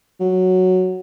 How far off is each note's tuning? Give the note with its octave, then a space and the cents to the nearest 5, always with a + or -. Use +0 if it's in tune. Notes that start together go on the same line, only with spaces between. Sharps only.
F#3 +0